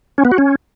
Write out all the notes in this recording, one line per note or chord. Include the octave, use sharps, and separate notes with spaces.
C#4
B3
F#4
C#4